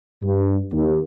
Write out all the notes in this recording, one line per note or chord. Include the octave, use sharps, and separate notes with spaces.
G2
D#2